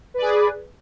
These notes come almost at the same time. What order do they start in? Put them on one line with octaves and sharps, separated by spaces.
B4 D5 G#4